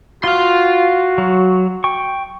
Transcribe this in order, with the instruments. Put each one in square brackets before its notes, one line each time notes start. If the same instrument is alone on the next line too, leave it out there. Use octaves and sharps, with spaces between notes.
[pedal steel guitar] F4 [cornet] F#4 [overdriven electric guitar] F5 C6
[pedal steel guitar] F#3
G5 C#6